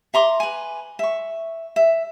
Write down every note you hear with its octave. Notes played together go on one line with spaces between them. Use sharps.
E5 A#5 C6 D6
B4 G#5
E5 C#6
E5